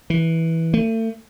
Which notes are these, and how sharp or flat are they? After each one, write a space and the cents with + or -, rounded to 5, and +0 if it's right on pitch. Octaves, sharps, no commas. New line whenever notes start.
E3 -10
A3 +35